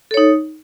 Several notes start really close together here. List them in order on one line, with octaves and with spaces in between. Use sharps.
A4 C#5 D#4